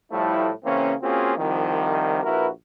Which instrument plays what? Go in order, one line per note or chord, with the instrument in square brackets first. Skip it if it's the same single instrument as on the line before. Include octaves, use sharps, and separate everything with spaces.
[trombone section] A2 F3 G3 A3 E4
C#3 E3 A#3 C4 C#4
A#3 C4 C#4 F4 F#4 G#4
C2 D#3 F3
A#1 E4 F#4 A#4 B4